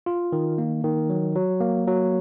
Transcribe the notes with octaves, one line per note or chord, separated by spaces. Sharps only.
F4
D#3
A#3
D#3
F#3
F#3
A#3
F#3